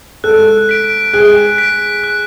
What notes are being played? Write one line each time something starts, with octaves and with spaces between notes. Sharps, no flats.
A4 F#6
B6 D7
G#4 F#6
B6 D7
F#6